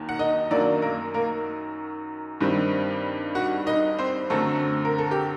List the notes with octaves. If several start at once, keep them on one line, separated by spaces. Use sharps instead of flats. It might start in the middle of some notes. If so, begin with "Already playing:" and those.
Already playing: D#2 D#3 F#3
F#5
D#4 D#5
F#2 D#3 F#3 A#3 D4 D5
A#3 A#4
A#3 A#4
G2 D#3 G3 C4
F#4 F#5
D#4 D#5
C4 C5
F#2 D3 F#3 A3 C4 A4
A#4
A4
G4